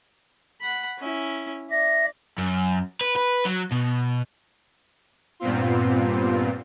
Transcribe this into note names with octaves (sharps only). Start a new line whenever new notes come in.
F#5 B5
C#4 E4
D5 E5 A#6
F#2
B4
B4
F#3
B2
G2 A#2 B3 C4 F4